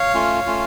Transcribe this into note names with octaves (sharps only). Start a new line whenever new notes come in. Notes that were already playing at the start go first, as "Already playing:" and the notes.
Already playing: C#5 F5
A3 C#4 F4
A3 C#4 F4